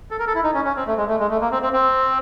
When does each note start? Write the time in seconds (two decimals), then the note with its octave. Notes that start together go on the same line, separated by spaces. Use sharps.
0.11 A4
0.19 A#4
0.27 A4
0.35 E4
0.43 D#4
0.54 C#4
0.65 C#4
0.76 C4
0.87 A3
0.97 G#3
1.08 A3
1.20 G#3
1.30 A3
1.41 A#3
1.52 C4
1.62 C4
1.73 C4